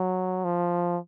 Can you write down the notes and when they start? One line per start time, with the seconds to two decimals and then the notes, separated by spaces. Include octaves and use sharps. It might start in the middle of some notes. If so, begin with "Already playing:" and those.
Already playing: F#3
0.44 F3